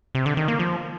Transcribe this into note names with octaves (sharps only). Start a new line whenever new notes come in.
C3
D3
D#3
A#3
F3